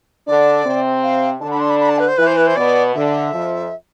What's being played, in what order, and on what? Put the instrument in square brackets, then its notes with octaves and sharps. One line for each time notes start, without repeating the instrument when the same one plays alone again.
[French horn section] D3 D4 [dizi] D5
[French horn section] C3 C4
[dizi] F5
[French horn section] D3 D4 [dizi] A5
[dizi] B5
C6
B5
B5
A5
B4
C5
[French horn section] E3 E4 [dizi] B4
[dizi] C5
B4
C5
[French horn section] B2 B3 [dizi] D5
[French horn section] D3 [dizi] E5
[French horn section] F2 F3